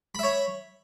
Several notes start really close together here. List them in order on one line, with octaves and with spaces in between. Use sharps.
B5 E5 C#5